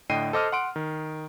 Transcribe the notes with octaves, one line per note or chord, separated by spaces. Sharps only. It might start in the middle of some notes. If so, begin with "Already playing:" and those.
A2 D3 D#5 G5 C7 D#7
A4 C5 D#5 D6 D#6 F6
F#5 C6 D7
D#3